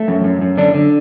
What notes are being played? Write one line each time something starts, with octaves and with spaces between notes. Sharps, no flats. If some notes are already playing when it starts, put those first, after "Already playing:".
Already playing: A3
F#2
F#2
F#2
D3 D4
D3